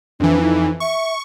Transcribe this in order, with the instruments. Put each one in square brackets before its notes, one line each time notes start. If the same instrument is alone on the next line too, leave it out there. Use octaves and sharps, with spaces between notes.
[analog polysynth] F2 E3 [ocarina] D4
[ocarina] D#4
[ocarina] E5 [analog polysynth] C#6